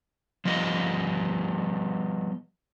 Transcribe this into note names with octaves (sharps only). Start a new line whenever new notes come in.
F3 G3 B3 D#5